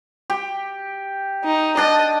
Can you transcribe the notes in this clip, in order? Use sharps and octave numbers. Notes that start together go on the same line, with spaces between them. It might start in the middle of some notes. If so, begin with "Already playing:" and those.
G4
D#4
D4 D#5 A5